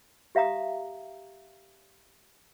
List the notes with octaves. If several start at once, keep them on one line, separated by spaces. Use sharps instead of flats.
G4 E5 F5 A#5 D#6